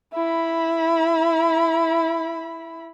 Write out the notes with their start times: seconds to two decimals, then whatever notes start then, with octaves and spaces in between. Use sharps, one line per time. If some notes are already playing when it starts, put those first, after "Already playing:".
0.14 E4 B5